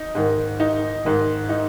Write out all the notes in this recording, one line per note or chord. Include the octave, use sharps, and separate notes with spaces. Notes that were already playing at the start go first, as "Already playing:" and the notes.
Already playing: D#4
G#2 D#3
D#4
G#2 D#3
D#4